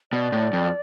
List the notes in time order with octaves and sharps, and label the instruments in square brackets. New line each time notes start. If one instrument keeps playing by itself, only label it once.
[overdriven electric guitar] B2 [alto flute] D5
[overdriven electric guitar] A2
F2